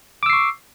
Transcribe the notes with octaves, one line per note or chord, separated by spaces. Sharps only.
C#6 D6 E6 C7